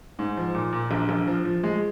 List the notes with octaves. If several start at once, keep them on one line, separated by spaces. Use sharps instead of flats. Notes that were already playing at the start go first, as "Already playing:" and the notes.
G#2
F3
A#2
A#2
A#1
A#1
F3
F3
G#3